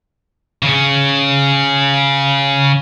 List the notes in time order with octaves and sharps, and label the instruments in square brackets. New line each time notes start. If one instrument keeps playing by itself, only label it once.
[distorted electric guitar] C#3 C#4